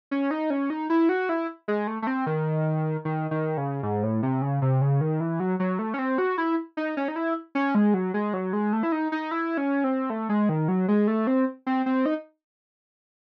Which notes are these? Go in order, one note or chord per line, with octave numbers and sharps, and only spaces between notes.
C#4
D#4
C#4
D#4
E4
F#4
E4
G#3
A3
A3
C4
D#3
D#3
D#3
C#3
G#2
A2
C3
C#3
C3
C#3
D#3
E3
F#3
F#3
A3
C#4
C4
F#4
E4
D#4
C#4
D#4
E4
C#4
G#3
F#3
G#3
F#3
G#3
A3
E4
D#4
D#4
E4
C#4
C4
A3
G#3
D#3
F#3
G#3
A3
C4
C4
C4
D#4